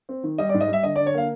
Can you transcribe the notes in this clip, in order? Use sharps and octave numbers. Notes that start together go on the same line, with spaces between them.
C4
D#3
G3 D#5
D5
G#2
D#5
G3 E5
D3 D#5
D5
D3
C#5
A#3 F5